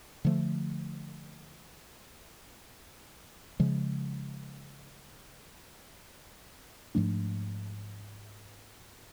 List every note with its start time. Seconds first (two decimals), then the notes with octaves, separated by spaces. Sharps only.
0.25 D3 F3 A3
3.60 C#3 F3 G#3
6.95 G#2 F3 A3 D4